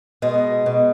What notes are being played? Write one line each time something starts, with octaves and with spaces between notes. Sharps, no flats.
B2 G#3
B2